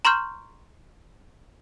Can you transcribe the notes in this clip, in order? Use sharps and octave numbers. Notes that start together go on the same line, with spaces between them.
A#5 C6 C#6 F6 G6